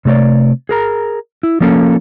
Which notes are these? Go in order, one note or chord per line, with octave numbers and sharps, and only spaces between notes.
C3 A3 A4 C#5 D5
G#4 A#4 A#5
E4
F3 A#3 C#4 A4